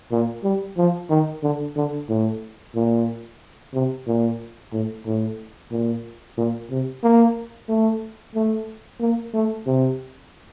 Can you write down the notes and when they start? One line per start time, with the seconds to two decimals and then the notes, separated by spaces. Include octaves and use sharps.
0.11 A#2
0.44 G3
0.77 F3
1.10 D#3
1.43 D3
1.76 D3
2.09 A2
2.75 A#2
3.74 C3
4.07 A#2
4.72 A2
5.06 A2
5.72 A#2
6.37 A#2
6.70 C3
7.03 A#3
7.69 A3
8.35 A3
9.01 A#3
9.34 A3
9.66 C3